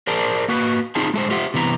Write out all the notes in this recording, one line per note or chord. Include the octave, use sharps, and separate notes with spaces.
G#4 A#4 C5 D5 A5
A#3 F#4 B4
C4 D#4 F4 G#4 C5 A5
G#3 A4 C5
F4 G4 C5 E5 F#5
C3 E3 B3 A#5